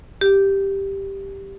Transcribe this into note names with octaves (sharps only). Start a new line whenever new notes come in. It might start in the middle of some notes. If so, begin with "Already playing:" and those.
G4